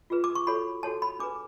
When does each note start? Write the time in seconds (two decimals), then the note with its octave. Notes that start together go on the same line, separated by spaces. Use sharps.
0.10 F4 G#4 B4
0.24 D6
0.35 C#6
0.47 F#4 A4 C#5 B5
0.83 F#4 A4 C#5 A5
1.02 B5
1.19 D4 G#4 B4 D6